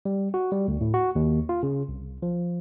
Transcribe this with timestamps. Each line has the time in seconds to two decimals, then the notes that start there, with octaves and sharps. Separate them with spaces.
0.05 G3
0.34 F#4
0.52 G3
0.68 D2
0.81 A2
0.94 F#4
1.15 D#2
1.49 F4
1.63 C#3
1.89 C2
2.22 F3